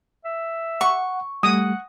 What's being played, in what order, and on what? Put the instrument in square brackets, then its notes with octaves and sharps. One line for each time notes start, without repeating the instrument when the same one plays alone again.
[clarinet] E5
[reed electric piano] F#5 [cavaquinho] C#6
[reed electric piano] G3 A3 [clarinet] F#5 [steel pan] D#6